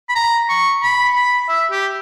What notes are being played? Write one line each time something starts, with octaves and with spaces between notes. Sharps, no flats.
B5
A#5
C#6
B5
B5
E5
G4